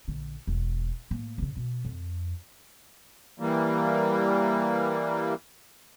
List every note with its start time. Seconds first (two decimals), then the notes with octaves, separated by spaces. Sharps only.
0.08 A#1 D3
0.47 E1
1.11 A2 A#3
1.38 F#2 C#3
1.57 B2
1.85 F2
3.40 E3 G3 A#3